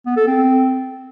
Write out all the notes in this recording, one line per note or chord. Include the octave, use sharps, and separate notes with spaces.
B3
A4
C4